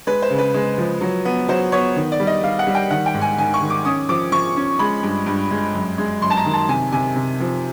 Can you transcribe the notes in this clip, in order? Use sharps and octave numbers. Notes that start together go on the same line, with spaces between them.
G#3 B4
C5
C#3
B4
G#3
F3
F#3
B3
F#3 C5
B3 C#5
D#3
D5
G3
D#5
G3 F5
F#5
G3
G5
D#3 F#5
G5
G#2
G#5
D#3 G#5
C#6
D#3
D6
C#4 D#6
F3 D6
F3 C#6
C#4
G#3 B5
G2
G2
G#3
F#2
G#3
F#2 C6
A5
A#5
D#3
A5
C3 G#5
C3 G#5
C3
F3